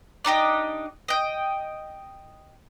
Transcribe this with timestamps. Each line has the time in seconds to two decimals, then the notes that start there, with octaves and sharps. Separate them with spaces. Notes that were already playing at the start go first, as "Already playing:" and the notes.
0.25 D4 D#4 G4 D#5
1.08 D#5 G5